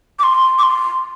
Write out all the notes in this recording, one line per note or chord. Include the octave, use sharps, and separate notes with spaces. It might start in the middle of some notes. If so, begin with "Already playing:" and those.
D6
C6
D6
C6